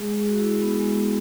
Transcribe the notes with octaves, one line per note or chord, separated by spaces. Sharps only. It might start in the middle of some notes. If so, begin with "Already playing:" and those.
Already playing: G#3 G#4
G#3 G#4
F#4
E4
B3
G#3
B3